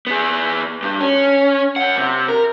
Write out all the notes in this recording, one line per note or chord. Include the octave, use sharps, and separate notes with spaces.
B3 G#4
G2
C#4
F#2 F#5
C3
A#4